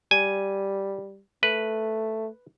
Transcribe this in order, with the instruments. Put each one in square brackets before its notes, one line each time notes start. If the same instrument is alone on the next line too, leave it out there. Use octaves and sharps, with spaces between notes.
[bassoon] G3 [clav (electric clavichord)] G#5
[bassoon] A3 [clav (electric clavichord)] B4